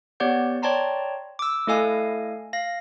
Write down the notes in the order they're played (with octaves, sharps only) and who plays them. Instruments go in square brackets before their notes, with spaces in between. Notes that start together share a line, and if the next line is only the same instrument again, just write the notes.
[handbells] B3 G4 C#5 D5 F#5 G6
C#5 D5 G5 A5 A#5 C6
D6 E6
A3 E4 A4 D#5 F5 G#5
F5 A#6